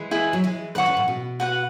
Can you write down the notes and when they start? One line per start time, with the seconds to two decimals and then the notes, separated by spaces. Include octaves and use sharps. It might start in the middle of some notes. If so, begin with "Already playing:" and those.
Already playing: E3 G#3
0.11 E4 G#4 B4
0.33 F#3
0.44 E3 G#3
0.75 D3 F#3 B4 F#5 C#6
0.86 C#3 E3
0.97 A2
1.08 B2
1.40 F#4 B4 F#5